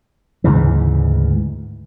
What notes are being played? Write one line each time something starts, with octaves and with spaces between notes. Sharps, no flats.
D2 G#2 C#3 E3